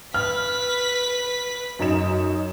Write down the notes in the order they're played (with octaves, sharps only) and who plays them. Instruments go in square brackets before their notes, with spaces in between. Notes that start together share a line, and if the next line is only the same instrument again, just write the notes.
[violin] B4 B6 [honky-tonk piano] F6
[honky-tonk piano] F#2 D#4 E7